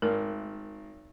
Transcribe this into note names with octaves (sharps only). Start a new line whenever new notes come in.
G#1 A#4 F6